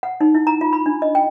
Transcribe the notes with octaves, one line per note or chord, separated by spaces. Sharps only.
F#5
D#4
E4
A#5
F4
B5
D4
D#5
G5